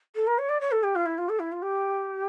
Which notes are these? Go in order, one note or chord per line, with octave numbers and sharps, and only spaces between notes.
A4
A#4
C#5
D5
C#5
A4
G4
F4
E4
F4
A4
E4
F4
G4